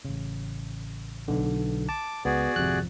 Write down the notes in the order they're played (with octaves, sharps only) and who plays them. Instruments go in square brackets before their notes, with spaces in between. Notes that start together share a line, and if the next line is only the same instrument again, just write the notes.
[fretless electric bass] A1 C#3
[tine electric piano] B1 D3
[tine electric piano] A5 [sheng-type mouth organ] D6
[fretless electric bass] C#2 [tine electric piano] B3 [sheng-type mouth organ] F#4 G#4 D5
[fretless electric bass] G#1 F2 F3 [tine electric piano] C3 F#6